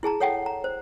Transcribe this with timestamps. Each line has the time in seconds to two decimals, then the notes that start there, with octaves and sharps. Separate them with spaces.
0.03 E4 G#4 A5 A#5
0.20 A4 C#5 F#5 G5
0.46 A#5
0.64 C5